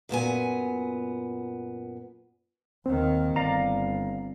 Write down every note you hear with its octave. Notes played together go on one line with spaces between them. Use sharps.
F#2 A#2 B3 G#5
D#2 D#3 C4
G1 D5 F5 A#5